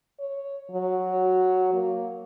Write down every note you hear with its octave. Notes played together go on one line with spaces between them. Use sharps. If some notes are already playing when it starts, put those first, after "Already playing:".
C#5
F#3
A#3